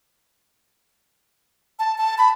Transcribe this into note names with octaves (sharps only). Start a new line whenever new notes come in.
A5
A5
B5